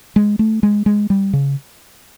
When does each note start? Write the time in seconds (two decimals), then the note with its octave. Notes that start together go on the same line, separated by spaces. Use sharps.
0.16 G#3
0.39 A3
0.63 G#3
0.86 G#3
1.10 G3
1.33 C#3